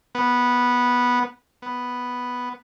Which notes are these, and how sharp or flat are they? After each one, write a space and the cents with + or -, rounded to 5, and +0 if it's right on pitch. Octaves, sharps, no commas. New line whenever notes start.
B3 -10
B3 +0